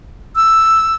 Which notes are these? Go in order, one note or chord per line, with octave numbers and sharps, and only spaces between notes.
E6